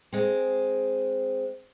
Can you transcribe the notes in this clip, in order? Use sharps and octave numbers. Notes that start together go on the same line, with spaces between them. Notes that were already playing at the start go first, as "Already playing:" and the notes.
G#3 C4